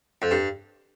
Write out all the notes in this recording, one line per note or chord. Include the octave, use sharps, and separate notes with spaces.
F2
G2